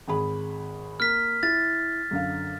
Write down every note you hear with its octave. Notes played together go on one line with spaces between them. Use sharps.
G#1 G#4 B5
A#3 F6 B6
E4 A6
F#2 D3 F5